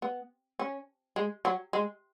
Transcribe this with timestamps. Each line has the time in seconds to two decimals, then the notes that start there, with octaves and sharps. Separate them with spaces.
0.02 B3
0.59 C#4
1.16 G#3
1.45 F#3
1.73 G#3